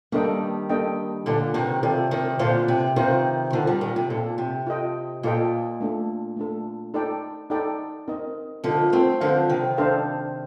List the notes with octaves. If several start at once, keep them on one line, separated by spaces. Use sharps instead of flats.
D#3 G3 A#3 D4 A4 D#5 G5
A#3 D4 A4 D#5 G5
A#2 D3 F4 A4 D5 F5
C3 D#3
C3 F4 A4 D5 F5
C3 D#3
A#2 D3 F4 C5 F5
C3
C3 D#3 F4 C5 F5
D3 F3 C4 D#4 A4
D#3 G3
A#2
C3
A#2 C4 D#4 A4
C3
F4 A4 D#5 G5
A#2 F4 A4 D#5 G5
A3 D4 A4
A3 D4 A4
D#4 A4 D5 G5
D#4 A4 D5 G5
C4 D#4 A#4 D#5
D3 F3 C4 D#4 A#4 D#5
A3 C4
D3 F3 D4 A4 C5 F5
C3 D#3
D4 A4 C5 F5